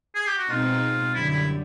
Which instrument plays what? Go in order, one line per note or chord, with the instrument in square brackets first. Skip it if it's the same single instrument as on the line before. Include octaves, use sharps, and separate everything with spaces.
[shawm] G#4
G4
F#4
[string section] B2 G#3 C4 D#4 [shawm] F4
[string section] F#2 D3 G3 [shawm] E4
[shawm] E4